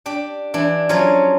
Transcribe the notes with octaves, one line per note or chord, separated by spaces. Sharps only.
D4 G4
E3 D4
F3 F#3 C#4 G#4 C#5